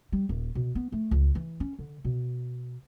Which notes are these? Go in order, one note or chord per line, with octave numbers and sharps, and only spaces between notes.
G3
D#1
B2
B3
A3
C#2
E3
C#4
D3
B2